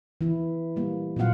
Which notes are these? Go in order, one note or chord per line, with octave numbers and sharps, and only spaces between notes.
E3 E4
G3 A#3
A#2 F#3 C4 F4 F5 F#5